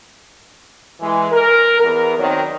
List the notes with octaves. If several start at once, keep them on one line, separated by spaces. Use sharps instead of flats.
E3 G#3
A#4
E2 B3 A#4
D#3 F#3 C4 D5